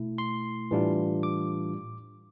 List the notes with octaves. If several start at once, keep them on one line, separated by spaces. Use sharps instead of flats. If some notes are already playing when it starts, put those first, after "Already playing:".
Already playing: B2 A3 E4
C6
A2 E3 G3 D4 F4
D6